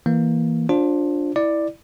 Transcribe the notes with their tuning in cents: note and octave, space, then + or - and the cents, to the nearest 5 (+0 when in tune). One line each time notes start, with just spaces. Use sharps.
E3 +0 A#3 +0
D4 +0 F4 +20 C5 +25
E4 -10 D5 +10